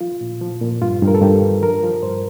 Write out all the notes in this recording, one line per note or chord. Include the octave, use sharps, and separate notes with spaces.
F3 F4
A#2
F3
A#2
G2 F4
G2
A#4
A4
G2 G4
G3
F3 A#4
F3
G2 C5